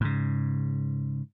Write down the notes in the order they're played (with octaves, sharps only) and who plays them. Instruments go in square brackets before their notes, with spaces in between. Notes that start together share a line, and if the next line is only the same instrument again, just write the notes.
[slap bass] G#2 C#3